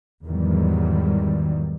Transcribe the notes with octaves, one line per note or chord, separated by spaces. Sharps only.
E2 G#2 D#3 F#3 G3